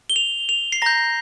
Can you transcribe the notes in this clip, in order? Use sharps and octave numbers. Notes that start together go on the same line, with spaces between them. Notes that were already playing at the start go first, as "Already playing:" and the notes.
G7
F7
F7
C7
A#5 G6 A#6